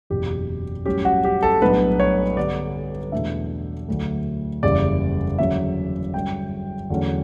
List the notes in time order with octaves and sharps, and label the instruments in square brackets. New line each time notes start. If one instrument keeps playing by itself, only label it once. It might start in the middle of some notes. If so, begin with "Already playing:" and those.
[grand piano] F#1 E2 B2 G4
A1 G2 F#3 C#4 G4
F#4
G4
A4
B1 A2 G3 B3 D4 B4
C#5
G2 D3 G3 B3 D5
E2 B2 A3 D4 E5
D2 D3 F#3
F#1 E2 C#3 G3 D5
E2 D3 F#3 C#4 E5
G2 D3 F#3 C#4 G5
E2 D3 F#3 A3 C#4